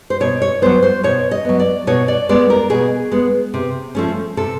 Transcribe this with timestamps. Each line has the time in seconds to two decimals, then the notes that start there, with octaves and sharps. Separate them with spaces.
0.10 C5
0.20 B2 C#5
0.42 C#5
0.62 F#3 B3 C5
0.83 C5
1.04 B2 C#5
1.31 D#5
1.45 F#3 B3
1.60 D5
1.87 B2 C#5
2.08 D5
2.29 G#3 B3 D5
2.50 A#4
2.70 B2 G#4
3.11 G#3 B3
3.54 C3
3.95 F3 A3 C#4
4.37 C3 A4